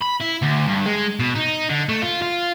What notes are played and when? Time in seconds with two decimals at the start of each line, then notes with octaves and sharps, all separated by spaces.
0.02 B5
0.21 E4
0.43 D2
0.68 G2
0.86 G#3
1.19 B2
1.35 D#4
1.69 D3
1.89 A3
2.02 F4
2.22 F4